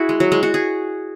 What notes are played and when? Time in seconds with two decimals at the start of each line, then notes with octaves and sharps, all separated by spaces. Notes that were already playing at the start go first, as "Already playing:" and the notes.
Already playing: E4 F#4 G#4
0.09 G#3
0.20 F#3
0.32 G#3
0.43 F#4
0.54 G#4